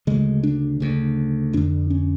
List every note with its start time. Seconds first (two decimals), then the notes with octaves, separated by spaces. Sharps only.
0.07 D2 C#3 G#3
0.43 D4
0.80 D2 C#3
1.53 F2 D3 D4
1.90 C#4